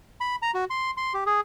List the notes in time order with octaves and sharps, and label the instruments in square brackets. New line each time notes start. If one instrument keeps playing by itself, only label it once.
[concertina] B5
A#5
F#4
C6
C6
G4
G#4